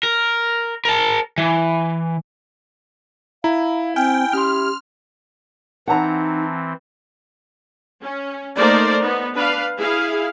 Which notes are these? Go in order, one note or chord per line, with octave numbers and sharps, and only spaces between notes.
A#4
A#4 A5
E3
E4 F5 A#5
C4 G5 G#5 F6
C#4 G4 C6 F6
E3 C4 D#4 F#5 A5 A#5
C#4
A3 A#3 D#4 A#4 C5 D5
B3 D#4
D4 B4 F5
E4 G#4 F5